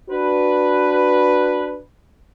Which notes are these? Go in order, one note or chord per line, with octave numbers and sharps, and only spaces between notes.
D4 F#4 B4